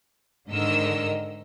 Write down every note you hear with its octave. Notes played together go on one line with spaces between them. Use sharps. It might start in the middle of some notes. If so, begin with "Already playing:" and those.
G#2 D3 D#3 A#4 D#5 E6